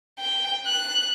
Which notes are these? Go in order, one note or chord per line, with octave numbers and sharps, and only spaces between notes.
G5
F#6